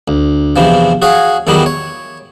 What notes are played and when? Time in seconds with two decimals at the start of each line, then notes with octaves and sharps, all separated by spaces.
0.08 D2
0.56 E2 C3 E3 F3
1.02 F#4 G#4 C#5 F5
1.47 E2 D#3 E3 F#3 G3 D#4
1.66 C#5